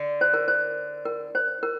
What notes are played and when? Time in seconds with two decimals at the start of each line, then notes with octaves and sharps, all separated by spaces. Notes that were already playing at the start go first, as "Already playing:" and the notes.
Already playing: D3
0.21 C5
0.34 A#4
0.48 C5
1.05 A#4
1.35 C5
1.63 A#4